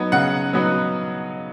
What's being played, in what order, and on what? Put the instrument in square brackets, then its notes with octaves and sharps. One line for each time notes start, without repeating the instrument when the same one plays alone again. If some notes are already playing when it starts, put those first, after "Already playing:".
Already playing: [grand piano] F#3 B3 D#4
C#3 F#5
F#3 B3 D#4